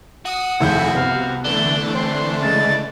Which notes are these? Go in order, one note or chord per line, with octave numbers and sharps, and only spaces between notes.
F#4 D#6
F1 D#2 A3 E4 G#4 G6
C2 C3 B3 F5
D3 E3 A3 D4 G7
C4 C6
C#3 G#3 A6